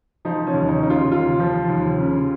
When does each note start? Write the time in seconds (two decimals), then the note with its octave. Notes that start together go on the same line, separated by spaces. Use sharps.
0.25 F3 D#4
0.47 C#4
0.54 D#2
0.68 D#4
0.83 C#3 D#4
0.90 F4
1.11 D#2 F4
1.39 F3
1.69 D#2
1.98 C#3